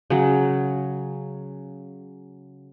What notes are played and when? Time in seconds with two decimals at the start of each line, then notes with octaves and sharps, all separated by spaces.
0.10 C#3 F#3